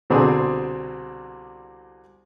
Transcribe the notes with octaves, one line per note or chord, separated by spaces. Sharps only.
C2 B2 D3 C4 D4 G#4